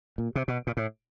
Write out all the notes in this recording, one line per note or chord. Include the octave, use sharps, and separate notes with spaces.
A#2
C3
B2
A#2
A2